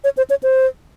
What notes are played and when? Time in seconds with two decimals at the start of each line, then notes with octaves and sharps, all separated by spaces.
0.04 C#5
0.17 C5
0.30 C#5
0.43 C5